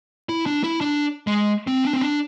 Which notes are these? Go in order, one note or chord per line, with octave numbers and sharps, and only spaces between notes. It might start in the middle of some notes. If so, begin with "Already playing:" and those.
E4
D4
E4
D4
G#3
C4
D4
C4
D4